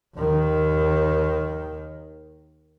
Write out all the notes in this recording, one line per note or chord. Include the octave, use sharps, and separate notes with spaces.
D#2 D#3